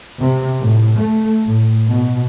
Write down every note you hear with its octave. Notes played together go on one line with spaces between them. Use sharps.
C3
A2
A3
A2
B2